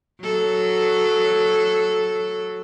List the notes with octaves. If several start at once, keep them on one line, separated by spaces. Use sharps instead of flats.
F#3 A4